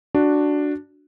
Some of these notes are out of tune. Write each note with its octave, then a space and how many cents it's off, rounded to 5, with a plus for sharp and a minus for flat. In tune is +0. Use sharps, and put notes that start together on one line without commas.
D4 +0 F#4 +0